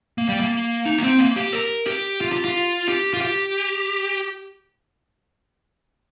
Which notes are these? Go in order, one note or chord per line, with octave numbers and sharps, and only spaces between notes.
A#3
G3
A#3
D#4
A#3
C4
A#3
G4
A#4
G4
F4
G4
F4
G4
F4
G4